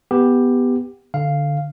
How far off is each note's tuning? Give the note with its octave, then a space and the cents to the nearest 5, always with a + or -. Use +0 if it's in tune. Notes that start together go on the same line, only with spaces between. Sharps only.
B3 +0 G4 +10
D3 +0 F5 -5